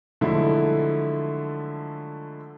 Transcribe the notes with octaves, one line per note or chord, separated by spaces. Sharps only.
D3 F3 F#3 G#3 A3 E4